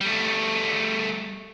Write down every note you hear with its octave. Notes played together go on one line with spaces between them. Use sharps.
G3 A3